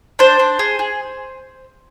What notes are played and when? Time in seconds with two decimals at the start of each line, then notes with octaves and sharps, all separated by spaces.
0.19 D4 C5
0.39 D4
0.59 G#4
0.79 G#4